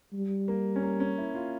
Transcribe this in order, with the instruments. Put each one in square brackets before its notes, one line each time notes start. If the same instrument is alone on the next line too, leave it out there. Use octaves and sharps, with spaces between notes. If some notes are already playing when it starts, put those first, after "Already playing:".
[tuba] G3
[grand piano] A#3
C#4
A#3
C#4
E4
F4